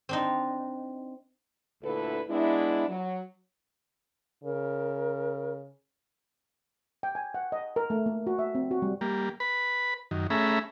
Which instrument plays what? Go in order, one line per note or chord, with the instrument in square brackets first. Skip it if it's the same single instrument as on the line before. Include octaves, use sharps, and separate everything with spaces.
[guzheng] C4 D4 D#4
[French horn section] D2 A#2 D3 E4 A4 B4
G#3 B3 D4 E4
F#3
[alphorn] C#3 [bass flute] A#4
[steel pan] G5
G#5
F#5
D#5
A#4
A3
A#3
F#4
E5
C4
F#4
G3
[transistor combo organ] G3 A#3
B4 B5
F#2 D#3
A3 C#4 G#4 E5 A#5 B5